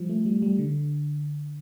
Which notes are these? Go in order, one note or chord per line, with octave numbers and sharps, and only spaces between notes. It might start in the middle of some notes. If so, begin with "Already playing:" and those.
Already playing: F3 G3
A3
G3
G3
D3